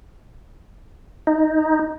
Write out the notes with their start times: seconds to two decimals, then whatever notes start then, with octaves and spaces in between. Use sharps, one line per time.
1.27 D#4